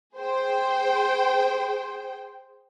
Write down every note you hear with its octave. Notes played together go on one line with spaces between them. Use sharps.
G#4 C5 G5